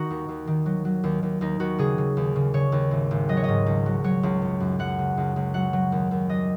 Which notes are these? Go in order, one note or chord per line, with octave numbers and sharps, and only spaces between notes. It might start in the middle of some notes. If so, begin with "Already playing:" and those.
Already playing: D#3 D#4 F#4
D#2
D#2
D#3
F#3
F#3
D#2
D#2
D#2 D#4
D#2 F#4
C#3 G#4
C#3
D#2
C#3
C#3 C#5
D#2
G#1
G#1
F#3 D#5
C#5
G#2 D#5
C#2
F#3
F#3 C#5
C#2
F#2
F#2
F#2 F#5
C#3
C#2
C#2
F#3 F#5
F#3
D#2
D#2
F#3 D#5